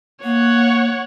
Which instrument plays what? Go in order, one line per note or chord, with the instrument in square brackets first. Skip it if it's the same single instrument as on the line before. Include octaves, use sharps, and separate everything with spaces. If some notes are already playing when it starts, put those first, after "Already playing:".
[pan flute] A#3 [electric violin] C#5 F#5